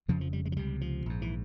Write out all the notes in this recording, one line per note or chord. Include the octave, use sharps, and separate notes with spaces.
F1 F2 C#3 F3
F3
G3
G#3
F3
C#2 C3 G3
F3
A#1 G#2
E3